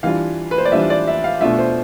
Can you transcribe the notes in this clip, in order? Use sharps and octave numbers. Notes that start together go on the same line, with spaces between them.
E3 G3 D4 F4 F5
B4
C5
D5
E3 G3 D4 F4 E5
D5
E5
F5
B2 A3 D4 F4 E5
C5